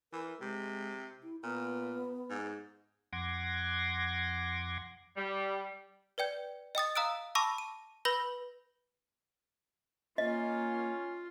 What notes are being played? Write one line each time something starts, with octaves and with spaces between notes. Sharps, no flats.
E3 A#4
C3 G#3
E4
A#2 B3
G#2
F2 F#5 C6 D6 G#6 A#6
G3
B4 D5 G5 G6
D#5 G5 D#6 A6
F5 A#5 D#6 E6 F#6 D7
A5 B5 C#6 D6 E6 A#6
D#7
B4 B5 E6 G6 A#6 F#7
A#3 C#4 F4 D#5